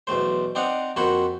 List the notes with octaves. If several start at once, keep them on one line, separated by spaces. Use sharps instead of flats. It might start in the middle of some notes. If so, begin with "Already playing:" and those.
B1 E2 A3 C5
C4 D4 D#4 D#5 F5 F#5
F2 A#3 F#4 A4 C5 B5